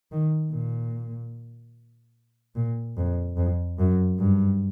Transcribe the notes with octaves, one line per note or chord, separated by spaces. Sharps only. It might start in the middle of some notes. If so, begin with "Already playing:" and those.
D#3
A#2
A#2
F2
F2
F#2
G2